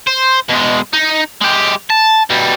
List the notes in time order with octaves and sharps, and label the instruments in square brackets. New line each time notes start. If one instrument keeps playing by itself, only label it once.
[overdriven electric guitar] C5
B2 G#3
D#4
G#3 G4
A5
B2 G3